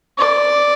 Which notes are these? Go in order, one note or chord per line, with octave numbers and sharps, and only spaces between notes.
D5